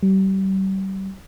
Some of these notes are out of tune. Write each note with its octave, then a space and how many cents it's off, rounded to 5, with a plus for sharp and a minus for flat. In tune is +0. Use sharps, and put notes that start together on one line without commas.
G3 -35